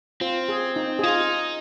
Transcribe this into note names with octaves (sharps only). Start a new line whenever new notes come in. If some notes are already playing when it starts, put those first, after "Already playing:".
C4 F4
G#4
D#4
G#4
D#4 F4